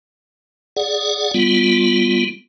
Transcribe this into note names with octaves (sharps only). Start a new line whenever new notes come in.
G#4 D5 F#5
G3 B3 F4